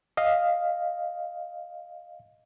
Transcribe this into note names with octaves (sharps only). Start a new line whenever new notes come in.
D#5 F5